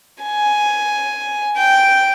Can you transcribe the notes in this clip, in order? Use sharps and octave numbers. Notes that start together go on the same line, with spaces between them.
G#5
G5